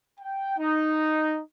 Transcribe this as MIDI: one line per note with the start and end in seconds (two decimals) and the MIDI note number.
0.20 0.56 79
0.58 1.40 63